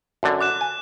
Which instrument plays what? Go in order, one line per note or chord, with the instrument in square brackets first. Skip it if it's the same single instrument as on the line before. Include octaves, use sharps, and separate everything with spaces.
[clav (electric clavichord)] F#2 D3
[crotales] D6 F#6 E7
[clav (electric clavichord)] G#5